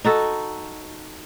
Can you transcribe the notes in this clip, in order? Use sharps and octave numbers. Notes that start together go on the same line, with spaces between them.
D#4 F#4 A4